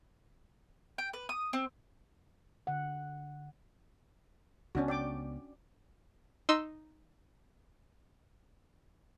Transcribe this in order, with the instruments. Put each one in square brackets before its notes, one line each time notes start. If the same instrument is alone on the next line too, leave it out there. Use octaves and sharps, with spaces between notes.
[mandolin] G5
B4
D#6
C4
[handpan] D3 F#5
[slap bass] C#2 C#3 B3 [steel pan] C#4 D4 F#4
[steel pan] D5 G5 D6
[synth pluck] D#4 C6 E6